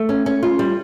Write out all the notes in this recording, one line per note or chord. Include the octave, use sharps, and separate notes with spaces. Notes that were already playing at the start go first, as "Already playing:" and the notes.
Already playing: A3
C#4
C#4
F4
G3